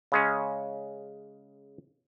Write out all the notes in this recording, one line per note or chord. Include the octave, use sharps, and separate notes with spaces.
C#3 G#3 C#4